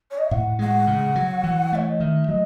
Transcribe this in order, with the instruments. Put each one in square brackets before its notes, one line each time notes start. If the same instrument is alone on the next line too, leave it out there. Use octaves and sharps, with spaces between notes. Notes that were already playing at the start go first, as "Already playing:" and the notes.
[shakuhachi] C#5
D#5
E5
[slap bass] A2 [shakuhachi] F#5
[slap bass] G#3 [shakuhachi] F#5
[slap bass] C#3
F#3
E3
[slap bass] A3 [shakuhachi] C#5
[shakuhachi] D#5
[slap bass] D#3 [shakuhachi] E5
[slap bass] F#3 [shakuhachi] D#5